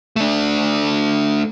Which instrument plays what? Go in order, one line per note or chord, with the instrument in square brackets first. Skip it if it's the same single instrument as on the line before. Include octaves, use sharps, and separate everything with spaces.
[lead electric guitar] A3 D4